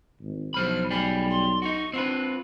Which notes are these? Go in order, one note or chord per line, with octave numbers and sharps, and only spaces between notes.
G#1
B1 F3 C5 B5 F6
G3 G#4 B5
C6
D#4 F#4 C#6
C4 D4 F4 B4